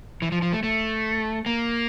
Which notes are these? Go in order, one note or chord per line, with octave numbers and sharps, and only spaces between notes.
E3
F3
F3
A3
A3
A#3